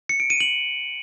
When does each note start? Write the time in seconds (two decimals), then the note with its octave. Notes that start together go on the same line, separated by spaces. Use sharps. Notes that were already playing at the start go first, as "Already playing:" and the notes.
0.09 C#7
0.20 D7
0.30 D#7
0.40 F#7